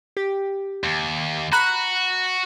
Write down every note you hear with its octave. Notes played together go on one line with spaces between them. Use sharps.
G4
D#2
F#4 A#5 B5 F#6